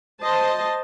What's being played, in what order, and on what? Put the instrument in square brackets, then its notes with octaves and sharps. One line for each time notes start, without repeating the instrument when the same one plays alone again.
[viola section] C5 D#5 A5 C6